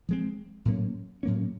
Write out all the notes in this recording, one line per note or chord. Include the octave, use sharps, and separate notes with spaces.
F3 G#3 C4
A2 F#3 A#3 C#4
A2 F#3 A#3 C#4